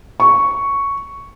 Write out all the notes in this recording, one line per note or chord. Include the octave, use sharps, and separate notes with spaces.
C#6